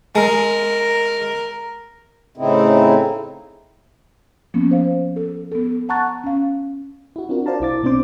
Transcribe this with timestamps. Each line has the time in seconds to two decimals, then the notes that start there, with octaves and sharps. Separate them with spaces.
0.15 G#3 A#4
2.37 A2 C#3 C4 D#4 E4
4.54 F3 A#3 B3 C#4
4.71 C5 F5
5.16 A4
5.52 B3 A4
5.89 F#5 A5 A#5 C#6 F#6 A6
6.24 C#4 F5
7.16 E4 F#4
7.29 C4 D4 F4 F#4 A#4
7.46 A#4 C5 D5 F5 A5 A#5
7.60 B1 E4 D6 A6
7.83 B2 C4 D4 C5 D6